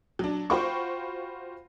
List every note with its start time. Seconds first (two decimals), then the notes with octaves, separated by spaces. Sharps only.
0.19 F#3 D4
0.50 F4 F#4 C5 G5 B5 C#6